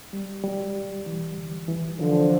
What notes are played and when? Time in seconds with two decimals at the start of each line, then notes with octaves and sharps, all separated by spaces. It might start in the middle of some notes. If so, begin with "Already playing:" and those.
0.13 G3
0.44 G3
0.75 G3
1.06 E3
1.37 D2
1.68 E3
1.99 D3 E3 F3